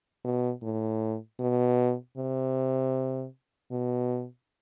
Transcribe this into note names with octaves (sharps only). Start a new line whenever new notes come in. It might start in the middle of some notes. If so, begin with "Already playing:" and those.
B2
A2
B2
C3
B2